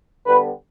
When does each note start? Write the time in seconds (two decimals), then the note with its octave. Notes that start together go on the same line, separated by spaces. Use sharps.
0.25 D3 G3 B3 B4